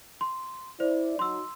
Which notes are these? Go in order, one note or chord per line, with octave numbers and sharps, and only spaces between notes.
C6
E4 C5 D5
F#3 D#4 C6 E6